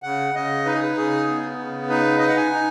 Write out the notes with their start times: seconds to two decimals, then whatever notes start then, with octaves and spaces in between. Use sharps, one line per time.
0.03 C#3 F#5
0.34 C#3 D#5
0.66 D#4 B4
0.74 G#4
0.81 B4
0.96 C#3 G#4
1.28 B3
1.58 C#3
1.89 D#4 B4
2.18 D#4 D#5
2.27 F#5
2.37 G#5
2.52 D#4